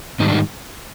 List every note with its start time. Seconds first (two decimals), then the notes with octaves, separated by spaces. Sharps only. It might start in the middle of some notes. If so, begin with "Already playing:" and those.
0.20 G#2 D#3 G3 D#4
0.28 D4
0.32 D#4